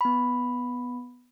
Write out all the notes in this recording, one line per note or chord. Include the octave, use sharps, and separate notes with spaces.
B3 B5